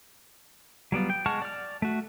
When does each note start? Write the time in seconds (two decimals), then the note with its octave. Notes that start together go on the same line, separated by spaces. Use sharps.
0.92 F#3 G3 B3 F4
1.10 G5
1.26 G#3 F#5 A5 C#6 F6
1.42 D5 F6
1.82 A3 F#4